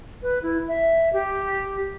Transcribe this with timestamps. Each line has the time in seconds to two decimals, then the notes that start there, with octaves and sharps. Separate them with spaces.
0.23 B4
0.43 E4
0.68 E5
1.13 G4